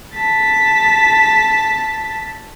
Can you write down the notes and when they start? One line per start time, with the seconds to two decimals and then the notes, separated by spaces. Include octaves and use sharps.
0.15 A5 B6